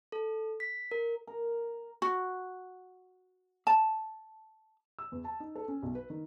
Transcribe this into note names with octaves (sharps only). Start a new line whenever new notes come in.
A4
B6
A#4
A#4
F#4
A5
E6
E2
A5
D#4
A4
C#4
B1
B4
D#3